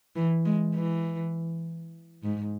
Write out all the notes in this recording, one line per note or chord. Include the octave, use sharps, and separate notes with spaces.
E3
G#3
E3
G#2